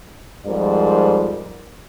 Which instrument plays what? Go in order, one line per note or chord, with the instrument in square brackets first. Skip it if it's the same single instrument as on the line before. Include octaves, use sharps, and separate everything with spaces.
[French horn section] F2 G#2 F3 G3 A#4 D5